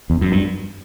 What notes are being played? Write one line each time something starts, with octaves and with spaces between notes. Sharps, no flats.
E2
F#2
G2